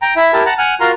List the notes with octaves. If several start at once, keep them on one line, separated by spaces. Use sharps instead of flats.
G5 A#5
E4 E5
E4 G4 A#4 A5
F#5 A5 A#5
F#5 G#5 F6
F4 F#4 A#4 A#5 C6 F6